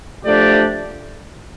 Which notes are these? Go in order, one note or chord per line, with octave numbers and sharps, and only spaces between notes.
F3 A3 D4 G4 D5